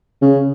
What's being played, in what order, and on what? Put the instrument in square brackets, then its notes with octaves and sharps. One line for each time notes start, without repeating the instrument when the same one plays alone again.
[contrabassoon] C#3